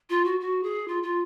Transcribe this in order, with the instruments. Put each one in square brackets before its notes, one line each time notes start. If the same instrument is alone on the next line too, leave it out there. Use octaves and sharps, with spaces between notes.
[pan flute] F4
F#4
F#4
G#4
F4
F4